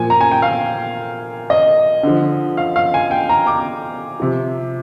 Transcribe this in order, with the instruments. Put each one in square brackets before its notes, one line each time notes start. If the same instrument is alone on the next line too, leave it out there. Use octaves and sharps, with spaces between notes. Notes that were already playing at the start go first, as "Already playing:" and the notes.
Already playing: [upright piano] A#2 F3 G#5
A#5
G#5
G5
F5
D#5
D3 F3
F5
F5
G#5
G5
A#5
D6
C3 F3